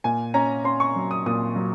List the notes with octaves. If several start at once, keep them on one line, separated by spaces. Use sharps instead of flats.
A#2 G#5
C#4 A#5
C#4 C6
C#6
F#3
D#6
A#2 D#6
F#3